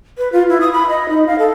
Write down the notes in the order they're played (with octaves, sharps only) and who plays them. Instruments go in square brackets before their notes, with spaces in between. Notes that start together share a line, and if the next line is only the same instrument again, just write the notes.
[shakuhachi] B4
F4
E4
D#6
B5
D#5
D#4
F5
A4